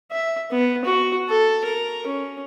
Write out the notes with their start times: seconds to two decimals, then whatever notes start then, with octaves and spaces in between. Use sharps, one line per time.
0.12 E5
0.51 B3
0.85 F#4
1.29 A4
1.64 A#4
2.07 C#4